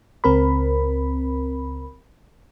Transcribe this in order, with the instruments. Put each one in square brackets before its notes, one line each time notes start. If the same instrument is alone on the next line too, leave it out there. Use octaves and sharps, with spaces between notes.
[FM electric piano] C#2 C4 A#4 B5